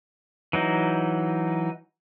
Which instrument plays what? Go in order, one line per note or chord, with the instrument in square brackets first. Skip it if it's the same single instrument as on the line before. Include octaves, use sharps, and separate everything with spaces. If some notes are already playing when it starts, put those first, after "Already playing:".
[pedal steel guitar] E3 F#3 D#4